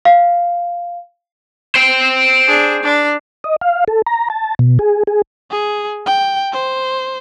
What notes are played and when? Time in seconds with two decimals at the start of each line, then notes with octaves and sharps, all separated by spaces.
0.05 F5
1.75 C5 G5
2.48 D4 G#4
2.83 D4
3.44 D#5
3.61 F5
3.88 A4
4.07 A#5
4.30 A5
4.59 B2
4.79 G#4
5.07 G#4
5.50 G#4
6.06 G5
6.53 C5